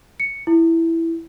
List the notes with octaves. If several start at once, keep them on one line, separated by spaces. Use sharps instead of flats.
C#7
E4